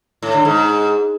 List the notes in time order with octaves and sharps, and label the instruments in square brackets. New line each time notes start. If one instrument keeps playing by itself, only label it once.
[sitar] A2
D3
G#2